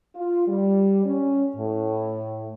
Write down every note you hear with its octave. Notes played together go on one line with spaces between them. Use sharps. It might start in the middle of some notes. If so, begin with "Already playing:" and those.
F4
G3
C#4
A2